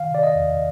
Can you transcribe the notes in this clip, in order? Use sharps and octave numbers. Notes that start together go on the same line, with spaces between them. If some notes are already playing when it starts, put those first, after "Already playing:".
Already playing: D#3 F5
C3 D5
D#5
E2